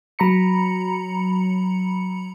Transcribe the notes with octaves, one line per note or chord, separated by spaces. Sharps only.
F#3 A#5 B5 C#7